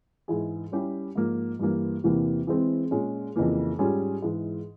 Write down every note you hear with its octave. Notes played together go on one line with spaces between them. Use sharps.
G#2 E3 G#3 E4 G#4
G3 C#4 E4 G4
G#2 F3 A#3
G2 E3 A#3
E2 C3 E3 A#3
E3 G#3 C4
A#2 G#3 C#4
F2 C#3 E3 A#3
G#2 G3 C#4 F4 G#4
G#2 E3 G#3